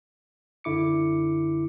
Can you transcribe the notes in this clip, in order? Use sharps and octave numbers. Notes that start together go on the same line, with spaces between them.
F#2 D3 E4 D6 C#7